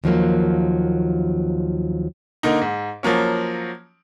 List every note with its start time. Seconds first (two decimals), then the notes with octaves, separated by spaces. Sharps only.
0.04 D#2 F3 F#3 A#3
2.43 D3 A#3 D#4
2.61 G#2
3.03 F3 F#3 A#3 C#4